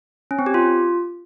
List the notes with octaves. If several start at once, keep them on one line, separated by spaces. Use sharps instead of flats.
C#4
C4
G4
F4